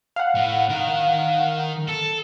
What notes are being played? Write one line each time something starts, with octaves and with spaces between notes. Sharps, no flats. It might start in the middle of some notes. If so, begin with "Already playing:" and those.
F5 F#5
A2
D#3 A#4
A4